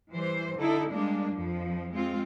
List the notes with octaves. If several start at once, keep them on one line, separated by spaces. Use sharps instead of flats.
E3 G3 C5
D3 D#4 E4 A4
G3 G#3 A#3 D4
F2 F3
G#3 C4 F4